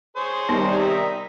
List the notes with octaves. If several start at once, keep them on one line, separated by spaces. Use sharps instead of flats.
G#4 C5 C#5
C3 D#3 G3 B3 D#4 C6
E5 A#5 D#6